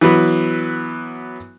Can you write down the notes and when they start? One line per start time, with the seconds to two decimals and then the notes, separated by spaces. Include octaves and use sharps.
0.01 E3 F#3 B3